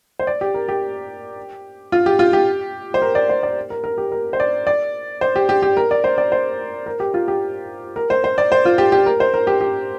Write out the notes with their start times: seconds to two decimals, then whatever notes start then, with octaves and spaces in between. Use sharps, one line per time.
0.19 C5
0.27 D5
0.41 G4
0.54 A#4
0.68 G4
1.92 F4
2.06 G4
2.19 F4
2.33 G4
2.94 C5
3.02 A#4
3.15 D5
3.29 C5
3.43 D5
3.70 A#4
3.84 A#4
3.98 G4
4.12 A#4
4.33 C5
4.40 D5
4.67 D5
5.21 C5
5.36 G4
5.49 G4
5.62 G4
5.77 A#4
5.91 D5
6.04 C5
6.18 D5
6.32 C5
6.86 A#4
7.00 G4
7.14 F4
7.28 G4
7.96 A#4
8.10 C5
8.24 C5
8.38 D5
8.52 C5
8.65 F4
8.78 G4
8.92 G4
9.06 A#4
9.20 C5
9.34 A#4
9.47 G4
9.61 G4